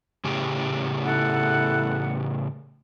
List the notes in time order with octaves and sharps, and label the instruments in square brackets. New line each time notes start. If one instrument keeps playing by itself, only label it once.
[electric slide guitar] A2 C#3 G4
[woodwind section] E4 A4 F#5